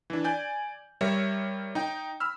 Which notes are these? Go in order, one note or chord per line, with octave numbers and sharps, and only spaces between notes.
E3 D4
D5 G#5 G6
G3 A#4 C#5 E5
D#4 G5
B5 E6 F6